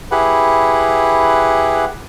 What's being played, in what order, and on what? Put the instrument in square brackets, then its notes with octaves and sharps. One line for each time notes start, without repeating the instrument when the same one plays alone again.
[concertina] E4 G4 G#4 B4 F#5